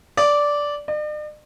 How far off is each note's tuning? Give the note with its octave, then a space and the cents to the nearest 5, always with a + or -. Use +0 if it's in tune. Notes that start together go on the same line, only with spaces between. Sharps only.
D5 -10
D5 +45